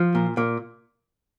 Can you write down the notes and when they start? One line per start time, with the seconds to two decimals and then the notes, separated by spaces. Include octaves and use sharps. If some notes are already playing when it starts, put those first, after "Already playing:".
Already playing: F3
0.15 A#2
0.37 A#2